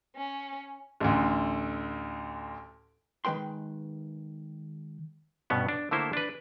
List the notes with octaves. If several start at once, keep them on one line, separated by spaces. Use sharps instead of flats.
C#4
A1 D2
D#3 G#3 B4 G5 C6
G2 B2 B3 C#4
D4
D3 A3 A#3 E4 C5
D4 B4